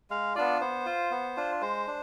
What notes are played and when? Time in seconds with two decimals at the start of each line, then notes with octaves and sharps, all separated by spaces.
0.10 G#3 F5
0.35 B3 D4 F4 D5
0.61 B3 C5
0.86 F4
1.11 B3
1.37 D4 F4
1.61 G#3 C5
1.87 D4